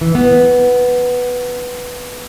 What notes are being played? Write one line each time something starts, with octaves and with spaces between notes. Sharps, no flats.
E3
B3